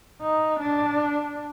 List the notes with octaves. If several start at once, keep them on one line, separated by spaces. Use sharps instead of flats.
D#4
D4